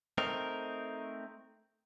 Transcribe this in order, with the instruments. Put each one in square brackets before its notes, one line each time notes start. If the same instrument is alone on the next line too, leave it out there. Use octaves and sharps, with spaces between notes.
[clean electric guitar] A3 C4 D#4 A#4